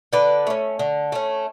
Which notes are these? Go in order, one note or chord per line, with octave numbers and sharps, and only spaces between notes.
D3 B4 D5
A3 C#4
D3
A3 C#4